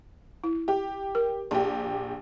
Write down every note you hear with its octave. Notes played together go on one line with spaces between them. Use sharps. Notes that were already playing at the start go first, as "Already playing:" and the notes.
E4
G4
A#4
A#1 G4